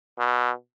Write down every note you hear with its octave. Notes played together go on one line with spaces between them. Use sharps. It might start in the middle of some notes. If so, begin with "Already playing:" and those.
B2